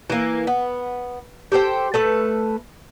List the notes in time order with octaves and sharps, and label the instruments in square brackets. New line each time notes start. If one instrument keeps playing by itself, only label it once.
[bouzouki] E3 A#3
B3
G4 A4 C5 G5
A3 A4 B4